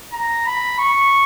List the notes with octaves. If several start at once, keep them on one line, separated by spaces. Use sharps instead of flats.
A#5
B5
C#6